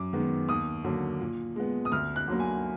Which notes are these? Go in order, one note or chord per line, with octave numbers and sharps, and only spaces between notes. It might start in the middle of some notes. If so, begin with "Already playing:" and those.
Already playing: F#2 D6
D#3 G#3 B3
D#2 D#6
D3 F#3 A#3
A#2
G#3 B3
D#6
D2 F6
F#6
D3 F#3 A#3
G#5